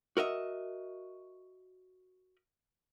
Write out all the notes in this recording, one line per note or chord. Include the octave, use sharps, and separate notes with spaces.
F#4 A#4 D#5 E5